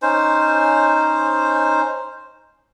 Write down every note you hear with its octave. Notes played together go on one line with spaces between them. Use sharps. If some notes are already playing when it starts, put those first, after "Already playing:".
C#4 D#4 C5